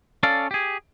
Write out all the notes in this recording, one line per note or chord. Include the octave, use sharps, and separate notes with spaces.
C#4 A4 D5 F5
G4 G#4